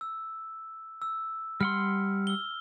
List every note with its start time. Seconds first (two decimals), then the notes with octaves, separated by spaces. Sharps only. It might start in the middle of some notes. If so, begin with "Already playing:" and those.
0.01 E6
1.02 E6
1.61 G3 F#5 C6 F6
2.27 E6 G7